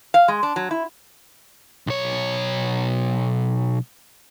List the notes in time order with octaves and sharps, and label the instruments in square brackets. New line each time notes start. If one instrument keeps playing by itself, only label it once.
[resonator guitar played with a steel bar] F5
G#3
D4
F#3
E4
[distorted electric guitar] B1 C#5